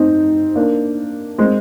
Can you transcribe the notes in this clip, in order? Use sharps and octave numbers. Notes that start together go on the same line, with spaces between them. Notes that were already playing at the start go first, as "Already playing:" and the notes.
Already playing: C4 D#4
A#3 D4
G#3 C4